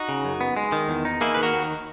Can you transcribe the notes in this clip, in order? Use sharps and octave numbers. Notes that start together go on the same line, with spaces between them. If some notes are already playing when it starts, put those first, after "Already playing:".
Already playing: D#4 F#4
C#3
F#2
B3
G#3
D#3
E2
D#4
A#3 E4 G#4
D#3 B4
F#4 A#4
D#2